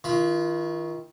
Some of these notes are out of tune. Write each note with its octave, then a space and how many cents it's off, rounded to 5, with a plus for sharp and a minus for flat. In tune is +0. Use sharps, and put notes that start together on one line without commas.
D#3 +25 F4 -25 B5 +0